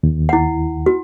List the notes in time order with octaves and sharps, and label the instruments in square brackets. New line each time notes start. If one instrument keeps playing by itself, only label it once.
[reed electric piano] D#2
[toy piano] E4 F#5
F#4